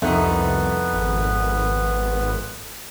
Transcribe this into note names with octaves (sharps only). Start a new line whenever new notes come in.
C2 F2 A3 B3 D#4 B4
G#1